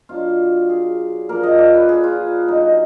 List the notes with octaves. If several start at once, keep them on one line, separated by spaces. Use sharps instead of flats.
B2 F#3 D4 F4
G#4
A#2 F3 A#3 A#4
D#5
D5
B4
G#4
F4
B2 F#3 D4 D#4